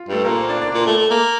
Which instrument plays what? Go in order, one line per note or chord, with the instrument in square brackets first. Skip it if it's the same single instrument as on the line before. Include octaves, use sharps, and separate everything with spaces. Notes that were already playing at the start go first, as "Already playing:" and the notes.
Already playing: [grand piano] F4
[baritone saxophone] G2 [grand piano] A3 A4
[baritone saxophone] A#2 [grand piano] A#3 A#4
[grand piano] C4 C5
D4 D5
D4 D5
[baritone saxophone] A#2
A3
A3
A#3